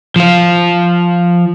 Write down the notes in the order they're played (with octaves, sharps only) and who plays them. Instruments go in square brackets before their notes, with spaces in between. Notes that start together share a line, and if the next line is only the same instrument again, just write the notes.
[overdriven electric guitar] F3 F4